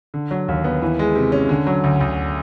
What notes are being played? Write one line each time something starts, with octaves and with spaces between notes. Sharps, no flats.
D3
F#3
D#2
B3
E3
G#3
C3
C#4
D3
F#3
D2
D2